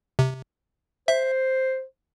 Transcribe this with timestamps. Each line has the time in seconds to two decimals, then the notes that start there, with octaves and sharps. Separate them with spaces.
0.19 C3
1.08 C5 E5